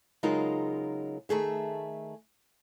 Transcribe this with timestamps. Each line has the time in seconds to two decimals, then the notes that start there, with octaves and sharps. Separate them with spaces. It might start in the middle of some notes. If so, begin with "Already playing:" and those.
0.23 C#3 F#3 G#3 D#4 F4 A#4
1.29 D#3 A3 G#4 E5